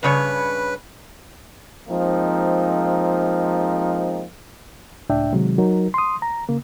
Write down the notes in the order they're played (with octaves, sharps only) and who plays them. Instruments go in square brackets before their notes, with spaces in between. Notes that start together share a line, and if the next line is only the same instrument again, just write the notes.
[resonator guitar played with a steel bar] G2 C#3 C#5 [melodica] B4
[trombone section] F3 G#3 A#3 C4 D#4
[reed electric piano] C#2 A2 D4 E5 G5
C3 D#3 F#3 G#3
F#3 D#4 A#4
C6 D#6
A#5
C#3 A#3